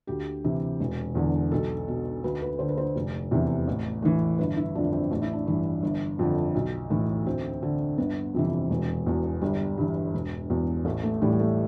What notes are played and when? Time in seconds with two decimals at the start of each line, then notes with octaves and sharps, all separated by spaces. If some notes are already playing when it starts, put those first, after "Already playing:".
0.07 D2 G4
0.44 C3 E3
0.80 E1
1.15 E2 D3
1.52 B1 A4
1.88 B2
2.24 D2 B4
2.42 B4
2.59 D3 C5
2.69 B4
2.78 C5
2.96 F1
3.31 E2 C3 E3
3.68 A1
4.02 A2 E3
4.38 G1 B4
4.57 E4
4.75 D3 D4
4.78 F2
4.92 C4
5.11 A1 D4
5.22 E4
5.33 D4
5.47 G2 E3
5.83 G1
6.19 F2 D3
6.55 B1
6.90 A2 E3
7.26 D2 C4
7.63 D3
7.98 G1 B3
8.34 F2 C3 E3
8.71 E1
9.06 E2 B2
9.41 G1 G3
9.78 G2 E3
10.14 E1
10.50 E2 B2
10.85 A1 A3
11.03 A3
11.21 A2 E3 G3
11.33 G3
11.40 A3